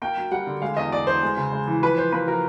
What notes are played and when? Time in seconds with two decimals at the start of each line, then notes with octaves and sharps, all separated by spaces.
0.02 A#3 G5
0.17 F#2
0.31 G3 F#5
0.47 D3
0.62 G#3 F5
0.77 E2 D#5
0.91 E2 D5
1.07 E2 C5
1.23 G#3
1.37 C#3
1.53 G#3
1.67 E3
1.82 F3 B4
1.97 F3 C5
2.12 A#3 B4
2.28 F3 A#4